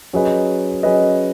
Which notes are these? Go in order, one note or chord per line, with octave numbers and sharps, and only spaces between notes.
F#3 C#4 G#4 B4 D#5
F#3 C#4 G#4 B4 D#5